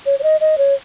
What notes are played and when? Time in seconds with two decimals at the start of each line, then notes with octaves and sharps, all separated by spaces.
0.06 C#5
0.19 C#5
0.23 D#5
0.41 D#5
0.58 C#5